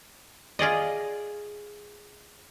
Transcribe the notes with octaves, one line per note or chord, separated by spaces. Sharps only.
F4 G#4 D5 D#5